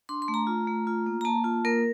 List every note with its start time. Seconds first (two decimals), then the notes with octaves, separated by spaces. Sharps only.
0.09 D4 C6
0.22 C6
0.28 A3
0.34 A#5
0.47 F4
0.67 A3
0.87 F4
1.06 A#3
1.21 A#5
1.25 A#3 A5
1.44 F4
1.65 A#3 A#4